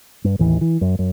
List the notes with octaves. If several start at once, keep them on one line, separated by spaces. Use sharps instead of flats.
G2
A1 D#2 E3
E3
F#2
F#2